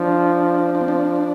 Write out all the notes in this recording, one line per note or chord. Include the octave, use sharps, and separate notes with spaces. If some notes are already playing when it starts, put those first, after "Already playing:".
Already playing: F3 D4
D4
C4
D4